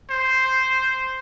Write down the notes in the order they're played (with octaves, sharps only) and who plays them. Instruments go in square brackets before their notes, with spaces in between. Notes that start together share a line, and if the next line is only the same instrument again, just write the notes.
[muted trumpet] C5